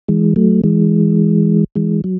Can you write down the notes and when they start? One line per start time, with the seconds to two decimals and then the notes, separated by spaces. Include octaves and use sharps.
0.08 E3 G#3
0.36 F#3 A3
0.64 E3 G#3
1.75 E3 G#3
2.04 F#3